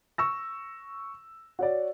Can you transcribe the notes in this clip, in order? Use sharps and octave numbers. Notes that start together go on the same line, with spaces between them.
C#6 E6 A#6
F#4 C#5 D5